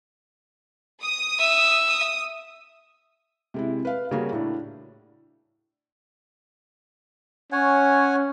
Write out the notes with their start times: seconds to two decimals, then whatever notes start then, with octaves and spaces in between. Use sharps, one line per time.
1.02 D#6
1.39 E5
1.87 D#6
3.54 C3 G#3 E4
3.85 B4 F5
4.11 C#3 G3 A#3 C#4 F#4 G#4
4.32 A2 D4
7.52 C#4 C#5 F#5 G#5